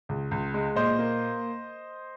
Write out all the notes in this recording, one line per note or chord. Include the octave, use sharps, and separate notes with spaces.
C#2
C#2
G#3
A#2 C5 D#5
A#3